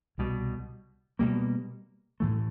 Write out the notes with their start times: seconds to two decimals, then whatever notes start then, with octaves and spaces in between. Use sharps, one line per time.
0.18 C2 B2 G3
1.19 B2 G3 A#3
2.20 A2 E3 A3